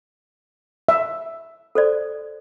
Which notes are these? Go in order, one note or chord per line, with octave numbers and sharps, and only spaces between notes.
E5
A4 C5 D5